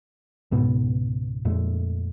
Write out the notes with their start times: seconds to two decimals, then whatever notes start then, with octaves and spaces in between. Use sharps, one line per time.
0.51 C#2 G#2 B2 B3
1.45 F2 A#2 G#3 A3